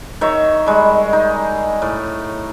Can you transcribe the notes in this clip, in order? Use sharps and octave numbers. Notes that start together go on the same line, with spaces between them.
D#3 C#5 E5
G3 G#3
D#4
A2